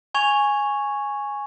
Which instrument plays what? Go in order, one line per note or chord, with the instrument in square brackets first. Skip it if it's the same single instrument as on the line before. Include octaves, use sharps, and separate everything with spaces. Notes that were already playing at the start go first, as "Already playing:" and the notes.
[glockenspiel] G#5 C#6 G#6 F7